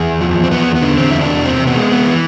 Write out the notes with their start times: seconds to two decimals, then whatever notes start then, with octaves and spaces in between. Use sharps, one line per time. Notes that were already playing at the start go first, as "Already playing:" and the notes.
Already playing: E2 G#4
0.21 F3
0.44 C4
0.51 E2 B3
0.75 B3
0.82 D3
0.97 C4
1.11 E2 E4
1.21 D4
1.45 C3 C4
1.67 B3
1.76 G#3
1.91 B3
2.07 E3